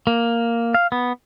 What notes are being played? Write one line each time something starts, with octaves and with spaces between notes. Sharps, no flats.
A#3
F5
B3